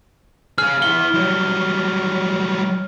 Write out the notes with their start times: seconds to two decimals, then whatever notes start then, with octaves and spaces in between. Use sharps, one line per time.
0.58 G#4 F5 F6
0.82 E4 F#5 G7
1.14 F#3 G3